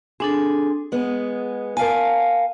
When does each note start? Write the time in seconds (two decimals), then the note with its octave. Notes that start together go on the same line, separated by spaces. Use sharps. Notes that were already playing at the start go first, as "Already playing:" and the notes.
0.20 C4 D4 G#4 A4
0.92 G#3 B3 F#5
1.77 A#4 F5 G#5 A5